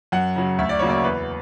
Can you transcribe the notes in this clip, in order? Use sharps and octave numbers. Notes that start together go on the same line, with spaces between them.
F#2 F#5
C#3 F#3
D2 E5
D5
C#3 F#3 A#3 C#5
D5
E2 B4